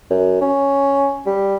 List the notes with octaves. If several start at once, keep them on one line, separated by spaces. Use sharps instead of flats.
F#2
C#4
G3